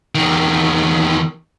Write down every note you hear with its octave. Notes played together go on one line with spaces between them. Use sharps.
E2 D#3